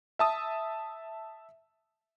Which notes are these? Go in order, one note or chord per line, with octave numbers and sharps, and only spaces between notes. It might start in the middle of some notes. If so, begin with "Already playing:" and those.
E5 A5 D#6